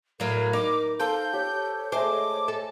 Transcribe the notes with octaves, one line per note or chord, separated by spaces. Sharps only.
A2 F#3 A#4 F5
D#4 D6
A4 C5 F5 G6
G4 C#5
G#3 A3 C5 D#5 D6
A4